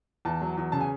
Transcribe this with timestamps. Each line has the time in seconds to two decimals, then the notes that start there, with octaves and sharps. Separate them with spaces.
0.25 E2 A5
0.42 F#3
0.57 E2
0.72 C#3 A5
0.80 G#5